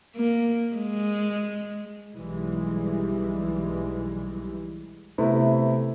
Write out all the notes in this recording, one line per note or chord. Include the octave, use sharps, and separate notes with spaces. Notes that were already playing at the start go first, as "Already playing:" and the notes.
A#3
G#3
B1 E3 G3 G#3
C3 A3 B3 E4